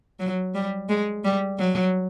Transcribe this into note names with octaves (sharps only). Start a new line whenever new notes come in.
F#3
G3
G#3
G3
F#3